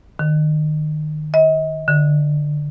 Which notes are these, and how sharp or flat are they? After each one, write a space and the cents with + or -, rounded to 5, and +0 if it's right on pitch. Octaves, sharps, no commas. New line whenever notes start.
D#3 -30
D#5 +40
D3 +10